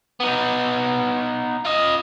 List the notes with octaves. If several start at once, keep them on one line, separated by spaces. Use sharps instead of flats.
B3 D#4
F4 D#5